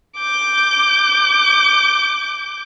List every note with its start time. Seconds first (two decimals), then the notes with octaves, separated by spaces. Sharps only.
0.19 D6 G6